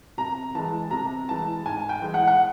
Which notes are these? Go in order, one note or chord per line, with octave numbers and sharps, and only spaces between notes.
C3 A#5
E3 G#3 A5
C3 A#5
E3 G#3 A5
G#2 G#5
G5
E3 G#3
F#5
F#5